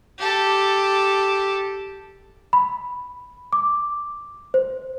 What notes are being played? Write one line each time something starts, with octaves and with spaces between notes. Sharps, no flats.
G4 A4
B5
D6
C5